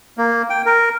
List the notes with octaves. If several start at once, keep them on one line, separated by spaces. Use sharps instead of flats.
A#3
G5
A#4